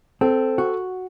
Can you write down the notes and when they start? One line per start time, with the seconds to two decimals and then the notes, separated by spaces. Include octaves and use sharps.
0.21 C4 A4
0.58 F#4